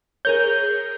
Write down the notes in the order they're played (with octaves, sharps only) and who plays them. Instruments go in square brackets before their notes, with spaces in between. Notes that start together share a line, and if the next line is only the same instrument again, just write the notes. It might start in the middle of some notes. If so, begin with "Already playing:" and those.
[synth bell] G#4 A#4 C#5 [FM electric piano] G6